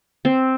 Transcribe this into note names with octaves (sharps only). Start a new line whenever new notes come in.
C4